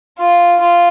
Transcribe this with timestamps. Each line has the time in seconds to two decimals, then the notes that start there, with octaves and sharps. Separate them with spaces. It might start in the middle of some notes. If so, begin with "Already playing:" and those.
0.18 F4
0.60 F4